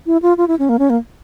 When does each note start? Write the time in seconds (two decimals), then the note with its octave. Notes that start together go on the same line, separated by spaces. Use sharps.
0.06 E4
0.22 F4
0.37 F4
0.48 E4
0.59 C#4
0.69 A#3
0.79 C#4
0.90 A#3